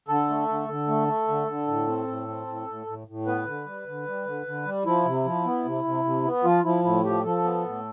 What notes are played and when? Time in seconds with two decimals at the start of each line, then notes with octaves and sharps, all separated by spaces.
0.08 D3 A4
0.29 A3
0.49 D3
0.69 D3
0.88 A3
1.08 A3
1.28 D3
1.47 D3
1.67 A2
1.87 C4
2.07 A2
2.28 C4
2.47 A2
2.67 A2
2.87 A2
3.07 A2
3.26 B3 B4
3.47 D3
3.66 G3
3.86 D3
4.07 G3
4.26 D3
4.46 D3
4.65 G3
4.85 F3 E4
5.05 C3
5.25 F3
5.45 B3
5.65 C3
5.84 C3
6.05 C3
6.25 B3
6.44 F3 F4
6.64 F3 E4
6.84 A2 E4
7.04 F3 G4
7.24 F3 A4
7.44 B3
7.64 A2